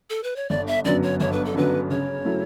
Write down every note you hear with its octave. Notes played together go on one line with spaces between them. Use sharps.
A4
B4
C#5
G1 D5
E5
F#2 D3 F#3 B3 D5
C#5
G1 C#5
B4
A4
F#2 D3 F#3 B3 B4
C#3 C#5
F#3 A3 E4